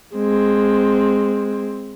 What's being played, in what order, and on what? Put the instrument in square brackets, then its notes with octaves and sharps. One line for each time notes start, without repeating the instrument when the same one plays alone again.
[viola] G#3 C4